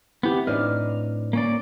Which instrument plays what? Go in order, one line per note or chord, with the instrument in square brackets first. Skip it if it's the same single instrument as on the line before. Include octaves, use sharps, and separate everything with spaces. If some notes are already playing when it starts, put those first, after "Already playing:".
[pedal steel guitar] B3 G4 [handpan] C4 E4
[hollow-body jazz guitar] A2 D4 D#4 [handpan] B4 D5 [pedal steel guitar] F6
[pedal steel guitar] A#3 C#4 D5